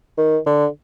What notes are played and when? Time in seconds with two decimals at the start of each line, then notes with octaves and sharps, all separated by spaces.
0.17 D#3
0.46 D3